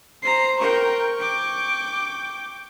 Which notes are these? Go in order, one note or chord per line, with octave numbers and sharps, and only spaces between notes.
C5 A#5 C7
A#4 G5 C#6
G5 D6